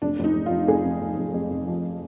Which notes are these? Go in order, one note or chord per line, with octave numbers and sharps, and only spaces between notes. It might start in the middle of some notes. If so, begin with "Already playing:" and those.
F1 D4
F1
D#4
F1
F4
F2
F1 G#4
F2
F1
F1
F2
F1
F3